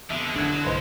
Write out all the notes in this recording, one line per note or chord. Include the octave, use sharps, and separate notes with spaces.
F1 F2 B2 D3 E5
D3 F#3 D#4 E4 G#6
B1 G2 A3 B4 C5 D#5 C6